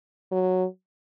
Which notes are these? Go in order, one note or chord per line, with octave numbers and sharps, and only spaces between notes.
F#3